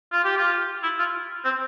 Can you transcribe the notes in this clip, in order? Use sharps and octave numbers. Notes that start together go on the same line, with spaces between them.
F4
G4
F4
E4
F4
C4